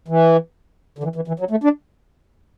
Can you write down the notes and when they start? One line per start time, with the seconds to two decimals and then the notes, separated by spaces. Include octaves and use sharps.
0.08 E3
0.99 D3
1.03 E3
1.16 E3
1.28 E3
1.40 F#3
1.51 A3
1.64 D4